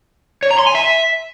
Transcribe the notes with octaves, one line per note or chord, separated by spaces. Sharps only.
C#5
A#5
C6
G#5
E5